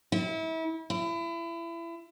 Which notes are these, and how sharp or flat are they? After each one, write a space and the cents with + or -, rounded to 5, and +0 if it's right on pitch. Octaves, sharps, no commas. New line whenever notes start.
E4 -30
E4 +30